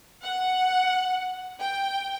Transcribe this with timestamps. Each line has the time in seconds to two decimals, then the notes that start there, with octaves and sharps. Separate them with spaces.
0.23 F#5
1.58 G5